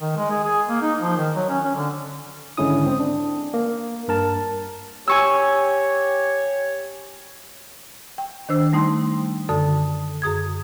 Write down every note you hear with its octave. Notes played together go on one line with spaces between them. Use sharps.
D#3
G#3
G#4
G#4
A#3
D#4
F3
D#3
F#3
C#4
C#4
D3
G#1 D3 G#3 C#4 E4 D#6
C4
D4
A#3
G2 A#4 A5
G4 C#5 G#5 C#6 E6
G5
D#3 D4 C5 E6
G3 A3 D#4 G5 C6
F#2 D3 A4 A5 D#6
F#2 G#4 D#6 G#6